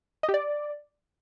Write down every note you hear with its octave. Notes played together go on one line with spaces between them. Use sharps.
D#5
G4
D5